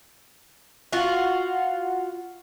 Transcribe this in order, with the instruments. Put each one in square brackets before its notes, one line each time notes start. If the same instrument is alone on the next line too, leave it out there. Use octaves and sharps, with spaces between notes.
[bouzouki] F4 F#4